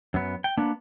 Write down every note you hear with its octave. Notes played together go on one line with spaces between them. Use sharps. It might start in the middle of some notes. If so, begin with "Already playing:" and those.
F#2 B3
G5
A#3 B3 D4